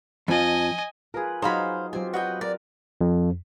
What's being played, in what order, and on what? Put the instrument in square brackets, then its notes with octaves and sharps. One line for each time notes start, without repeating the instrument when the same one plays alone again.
[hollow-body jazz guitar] F2 F3 [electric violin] D#5 G#5
[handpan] F4 B4 [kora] G#4 A#4
[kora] F#3 D#4 [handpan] G#4 [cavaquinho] C5 F5 B5
[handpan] F#3 F4 G4 [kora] C4 C5 [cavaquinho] G#5
[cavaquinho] F#4 D#5 G5 [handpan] B4
[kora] A#4 [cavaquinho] D5
[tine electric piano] F2